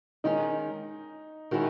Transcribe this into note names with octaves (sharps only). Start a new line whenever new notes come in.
D#3 G#3 C#4 D#4
D#3 G#3 C#4 E4 F#4